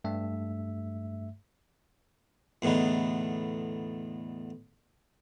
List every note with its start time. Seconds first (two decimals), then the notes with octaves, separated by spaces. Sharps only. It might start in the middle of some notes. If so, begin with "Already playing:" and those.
0.04 G2 A3 E5
2.62 E2 A2 D3 B3 D#4